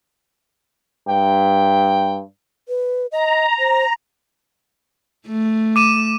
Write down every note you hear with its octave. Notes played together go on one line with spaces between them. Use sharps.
G2 G5
B4
D#5 A#5
C5
A3
D6 D#7 E7